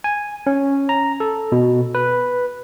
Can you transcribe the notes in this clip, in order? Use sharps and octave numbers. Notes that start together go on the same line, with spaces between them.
G#5
C#4
A#5
A4
B2
B4